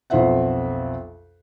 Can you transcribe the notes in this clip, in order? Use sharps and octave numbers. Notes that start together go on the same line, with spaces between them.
B1 F2 F4 C5 E5 F#5